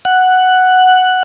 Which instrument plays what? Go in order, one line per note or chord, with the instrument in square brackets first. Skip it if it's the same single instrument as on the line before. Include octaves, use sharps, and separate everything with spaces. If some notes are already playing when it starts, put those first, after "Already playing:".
[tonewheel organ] F#5